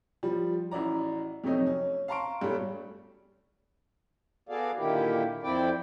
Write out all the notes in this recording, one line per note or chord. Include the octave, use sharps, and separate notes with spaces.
F3 G3
A1 E4 F#4 D5 A#5
F2 C3 F#3 A3 C#4 D#4
C#4
F5 A5 A#5 C6 C#6 D7
G2 B2 G3 A3 C#4
B3 F#4 G#4 A4 D5 F5
A#2 D3 D#3 A#3 E4 G4
F2 C4 E4 D5 G5